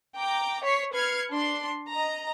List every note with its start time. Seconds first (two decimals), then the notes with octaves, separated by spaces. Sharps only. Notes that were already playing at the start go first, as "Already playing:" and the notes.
0.18 G5 A#5 D6
0.65 C#5 C#6 B6 C7
0.95 B4 F6 G#6 C7 C#7
1.32 D4 C6
1.88 D#5 A#5